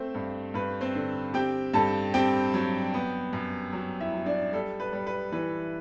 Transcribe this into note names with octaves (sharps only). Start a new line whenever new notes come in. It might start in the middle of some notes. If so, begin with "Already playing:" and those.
Already playing: A3 C4 C5
G2
G2 B4
C4 C5
D3
C4 G4 G5
G2 A4 A5
C4 G4 G5
F#3
B3
F#2
F#3
E4 E5
F#3
D4 D5
G3 A4
B4
G3
B4
E3 B4